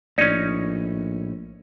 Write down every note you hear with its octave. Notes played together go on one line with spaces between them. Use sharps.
A#1 A2 F3 C#4 D#4 D5